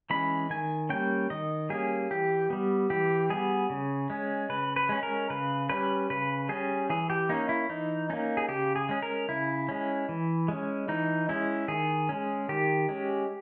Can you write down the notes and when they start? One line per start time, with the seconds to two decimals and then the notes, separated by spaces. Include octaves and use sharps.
0.10 E3 G#3 C#4 B5
0.50 D#3 G#5
0.90 G3 A#3 C#4 G5
1.30 D#3 D#5
1.70 G3 A#3 C#4 G#4
2.11 E3 G4
2.50 G3 B3
2.90 E3 G4
3.30 G3 B3 G#4
3.70 C#3
4.10 G#3 C#4
4.49 C#3 B4
4.76 B4
4.89 G#3 C#4
5.03 A#4
5.30 C#3 B4
5.69 G3 C#4 B4
6.10 C#3 B4
6.49 G3 C#4 G#4
6.90 E3 G#4
7.10 G4
7.29 A#3 C#4 D#4
7.49 E4
7.69 E3 D#4
8.10 A#3 C#4 D#4
8.37 G#4
8.49 C#3 G4
8.76 G#4
8.89 G#3 C#4
9.03 A#4
9.29 C#3 E4
9.69 G#3 C#4
10.09 E3
10.48 G#3 C#4
10.88 E3 D#4
11.29 G#3 C#4 E4
11.68 D#3 G#4
12.09 G#3 C#4
12.49 D#3 G4
12.89 G#3 C#4